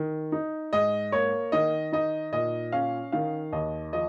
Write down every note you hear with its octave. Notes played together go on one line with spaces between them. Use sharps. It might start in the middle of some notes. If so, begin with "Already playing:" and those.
Already playing: D#3
D#4
G#2 D#5
A#3 C#5
D#3 D#5
D#4 D#5
A#2 D#5
C#4 F5
D#3 F5
D#2 D#5
F3 D#5